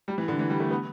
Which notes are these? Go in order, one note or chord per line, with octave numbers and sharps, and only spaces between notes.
G3
E3
D3
E3
G3
A3
B3